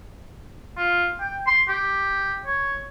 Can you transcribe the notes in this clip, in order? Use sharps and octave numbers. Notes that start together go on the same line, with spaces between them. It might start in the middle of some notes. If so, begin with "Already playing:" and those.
F4
G5
C6
G4
C#5